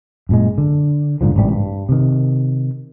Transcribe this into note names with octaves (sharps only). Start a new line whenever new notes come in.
F#2 A#2 G#3
D3
B1 G#2 D3 F3
A1 G#2 C3 G3
G2
C3 D#3